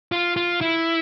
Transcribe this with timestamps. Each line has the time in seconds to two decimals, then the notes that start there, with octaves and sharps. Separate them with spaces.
0.12 F4
0.36 F4
0.61 E4